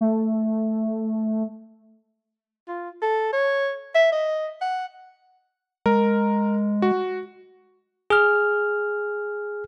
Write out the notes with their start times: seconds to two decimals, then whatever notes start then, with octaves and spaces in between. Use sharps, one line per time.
0.01 A3
2.68 F4
3.02 A4
3.33 C#5
3.95 E5
4.12 D#5
4.61 F#5
5.86 G#3 A#4
6.82 F#4
8.10 G#4 F6